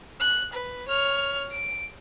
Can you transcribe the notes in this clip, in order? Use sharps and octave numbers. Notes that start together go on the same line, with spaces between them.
F#6
B4
C#5 F6
D7